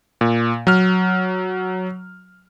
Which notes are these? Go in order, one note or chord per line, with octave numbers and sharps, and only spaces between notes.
A#2
F#3 F6